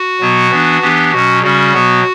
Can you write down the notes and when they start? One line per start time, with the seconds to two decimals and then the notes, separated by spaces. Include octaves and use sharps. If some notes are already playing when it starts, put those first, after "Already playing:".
Already playing: F#4
0.20 B2 F#3 B3
0.50 E3 B3 D4
0.82 E3 B3 D4 G4
1.12 B2 F#3 C#4 F#4
1.42 C#3 G3 C#4 F#4
1.73 B2 F#3 B3